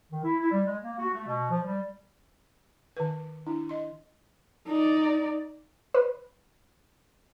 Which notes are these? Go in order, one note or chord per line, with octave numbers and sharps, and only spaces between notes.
D#3
E4
E4
G3
G#3
A#3
F#4
A3
B2
F3
G3
D#3 B4
D4 E4
D#5 C6
D#4 D5
B4